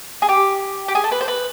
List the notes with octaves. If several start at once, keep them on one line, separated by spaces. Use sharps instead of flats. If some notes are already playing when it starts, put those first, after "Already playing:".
G#4
G4
G4
G#4
A4
B4
C5
B4